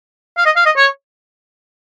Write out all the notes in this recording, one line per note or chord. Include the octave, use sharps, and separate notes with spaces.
F5
D#5
F5
D#5
C#5